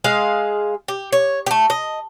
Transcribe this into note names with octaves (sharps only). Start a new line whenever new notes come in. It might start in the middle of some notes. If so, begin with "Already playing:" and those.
G#3 G#4 F5
G4
C#5
A3 G4
D#5